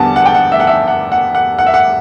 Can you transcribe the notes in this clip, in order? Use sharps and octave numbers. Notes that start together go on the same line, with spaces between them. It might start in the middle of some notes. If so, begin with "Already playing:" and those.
Already playing: E2 D3 G3 B3 F#5 A5
F#5
G5
F#5
E5
F#5
E5
F#5
F#5
F#5
F#5
E5
F#5